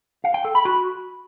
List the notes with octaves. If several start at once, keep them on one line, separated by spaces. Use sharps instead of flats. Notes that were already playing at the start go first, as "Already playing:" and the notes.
F5
G5
A4
B5
F#4